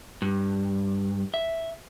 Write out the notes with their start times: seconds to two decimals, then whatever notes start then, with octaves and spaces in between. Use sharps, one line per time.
0.22 G2
1.34 E5